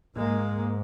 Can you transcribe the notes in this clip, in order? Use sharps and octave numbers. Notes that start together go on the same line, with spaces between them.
G#2 G#3 A#3